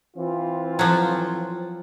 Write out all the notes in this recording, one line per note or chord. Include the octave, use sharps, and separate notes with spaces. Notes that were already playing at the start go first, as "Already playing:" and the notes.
E3 C4 F4
F3 F#3